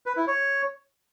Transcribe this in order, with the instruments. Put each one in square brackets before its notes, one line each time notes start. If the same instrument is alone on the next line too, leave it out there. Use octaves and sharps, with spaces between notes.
[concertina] B4
E4
C#5